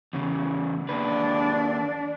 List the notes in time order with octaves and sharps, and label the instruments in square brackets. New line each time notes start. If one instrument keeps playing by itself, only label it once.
[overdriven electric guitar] E2 C#3
[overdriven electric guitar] D#2 B4 [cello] D4